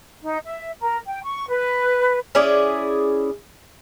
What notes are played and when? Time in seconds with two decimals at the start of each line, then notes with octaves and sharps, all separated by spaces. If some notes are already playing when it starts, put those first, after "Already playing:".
0.23 D#4
0.45 E5
0.80 A#4
1.06 G5
1.24 C#6
1.49 B4
2.35 C#4 E4 G#4 D5